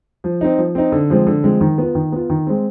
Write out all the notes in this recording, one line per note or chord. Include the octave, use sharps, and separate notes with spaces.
F3
C4 D#4
F3
C4 D#4
D3
F3 G#3 C4
D3
F3 G#3 C4
D#3
B3 F4
D#3
B3 F4
D#3
G#3 C4